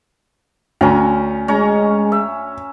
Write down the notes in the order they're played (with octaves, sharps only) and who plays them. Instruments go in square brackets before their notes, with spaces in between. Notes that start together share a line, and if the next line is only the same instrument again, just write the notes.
[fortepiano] D2 [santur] C#4 A#5
[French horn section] G#3 [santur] C#4 C#5 A#5
[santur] E5